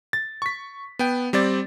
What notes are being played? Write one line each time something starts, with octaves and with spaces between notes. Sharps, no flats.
A6
C#6 B6
B3 G5
G3 C4 D5 A6